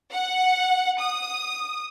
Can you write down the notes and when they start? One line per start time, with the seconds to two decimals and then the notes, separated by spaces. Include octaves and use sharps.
0.12 F#5
1.00 D#6